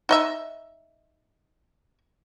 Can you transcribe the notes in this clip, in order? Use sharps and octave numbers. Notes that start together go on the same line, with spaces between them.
D#4 D#5 E5